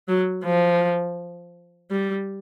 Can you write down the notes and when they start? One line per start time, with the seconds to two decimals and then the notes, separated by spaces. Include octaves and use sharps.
0.08 F#3
0.44 F3
1.91 G3